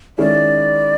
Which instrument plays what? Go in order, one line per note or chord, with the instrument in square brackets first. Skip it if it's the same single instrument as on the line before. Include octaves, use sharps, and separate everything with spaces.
[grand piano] D#3 G#3 C#4 E4 [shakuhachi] D5